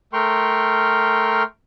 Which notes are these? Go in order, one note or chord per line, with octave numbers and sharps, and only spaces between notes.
A3 A#4 G5 C6 C#6 F6